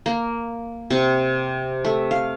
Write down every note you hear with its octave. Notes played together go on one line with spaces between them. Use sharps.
A#3
C3
A3
F5